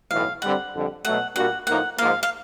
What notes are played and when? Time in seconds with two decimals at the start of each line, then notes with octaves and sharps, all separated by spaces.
0.11 B1 A2 E3 F5
0.41 G2 D3 G3 C4 F#5
0.73 F2 D3 G3
1.05 B2 F#3 A3 F#5
1.36 A#2 G3 A#3 D4 F#4 F#5
1.67 A2 F3 A#3 D#4 F#5
1.98 G#2 F3 A#3 F5
2.23 F5